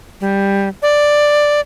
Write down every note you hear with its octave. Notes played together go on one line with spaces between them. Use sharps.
G3
D5